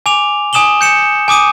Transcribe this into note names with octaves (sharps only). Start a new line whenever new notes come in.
G#5 D6 F7
G#5 D#6 E7 F#7 G7
G6 C#7 E7
G#5 D6 D#6 D#7